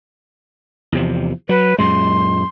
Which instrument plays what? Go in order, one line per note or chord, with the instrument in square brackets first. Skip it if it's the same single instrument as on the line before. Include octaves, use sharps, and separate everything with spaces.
[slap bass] E2 C3 F3
[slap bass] F#3 [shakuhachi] B4
[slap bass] F#2 A#2 G#3 [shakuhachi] C6